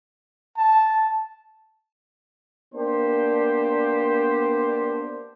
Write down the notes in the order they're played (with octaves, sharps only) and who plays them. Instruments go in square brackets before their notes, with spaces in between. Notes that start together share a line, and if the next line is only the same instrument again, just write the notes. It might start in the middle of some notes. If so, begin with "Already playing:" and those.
[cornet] A5
[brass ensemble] A#3 B3 D4 G4 C5